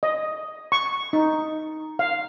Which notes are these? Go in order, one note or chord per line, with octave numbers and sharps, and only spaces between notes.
D#5
C#6
D#4
F5